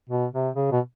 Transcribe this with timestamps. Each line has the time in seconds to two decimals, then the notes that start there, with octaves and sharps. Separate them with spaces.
0.09 B2
0.33 C3
0.56 C#3
0.72 B2